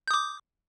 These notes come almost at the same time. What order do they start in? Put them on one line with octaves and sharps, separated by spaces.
G6 D#6 D6